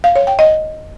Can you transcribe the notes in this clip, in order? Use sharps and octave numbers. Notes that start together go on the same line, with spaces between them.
F5
C#5
G5
D#5